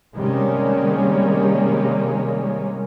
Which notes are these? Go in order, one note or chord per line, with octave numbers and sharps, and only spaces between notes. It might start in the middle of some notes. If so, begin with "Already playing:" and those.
C3 D#3 G3 G#3 A#3 C#4